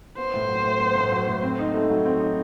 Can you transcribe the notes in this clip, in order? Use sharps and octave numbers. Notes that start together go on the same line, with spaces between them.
B3 C5
A2
F#3
A2
B3
A2
F#3
A2
C4
D#4
A3
F#3
C4
D#4